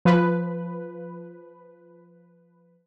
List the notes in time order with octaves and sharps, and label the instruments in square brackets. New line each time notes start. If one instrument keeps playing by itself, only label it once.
[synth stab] F3 B4